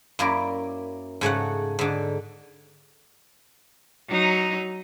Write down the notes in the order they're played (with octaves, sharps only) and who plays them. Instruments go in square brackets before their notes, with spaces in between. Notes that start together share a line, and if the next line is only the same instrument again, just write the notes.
[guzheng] F#2 A#3 E4 A#4 D5
G#2 C#3 A3 F#5
G#2 D3
[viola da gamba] F#3 D#4